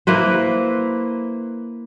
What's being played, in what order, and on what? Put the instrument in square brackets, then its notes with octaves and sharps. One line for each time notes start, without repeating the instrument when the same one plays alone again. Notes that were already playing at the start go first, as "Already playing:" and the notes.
[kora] A#3 E4 B4 C5